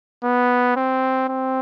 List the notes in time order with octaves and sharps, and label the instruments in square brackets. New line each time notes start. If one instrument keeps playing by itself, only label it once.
[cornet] B3
C4
C4